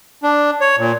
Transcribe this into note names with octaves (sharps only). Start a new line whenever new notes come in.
D4
C#5
A#2